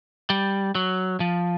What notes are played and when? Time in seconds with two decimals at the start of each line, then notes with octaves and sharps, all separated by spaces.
0.30 G3
0.75 F#3
1.20 F3